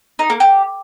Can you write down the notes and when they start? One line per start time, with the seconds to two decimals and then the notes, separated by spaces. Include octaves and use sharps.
0.19 D#4
0.30 A#3
0.40 G4